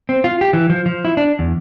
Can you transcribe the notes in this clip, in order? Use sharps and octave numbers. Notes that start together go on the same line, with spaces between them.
C4
F4
G4
E3
F3
F3
E4
D4
E2